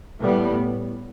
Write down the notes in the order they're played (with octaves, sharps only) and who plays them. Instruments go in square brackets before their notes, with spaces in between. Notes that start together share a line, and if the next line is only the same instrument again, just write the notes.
[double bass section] A2 G3 B3